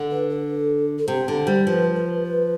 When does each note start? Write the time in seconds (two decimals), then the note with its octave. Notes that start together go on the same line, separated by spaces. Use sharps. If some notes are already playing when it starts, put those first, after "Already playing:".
Already playing: D3
0.11 B4
0.30 A4
0.98 A4
1.08 C3 G4
1.28 D3
1.46 G3 C5
1.66 F3 B4
1.95 B4
2.24 B4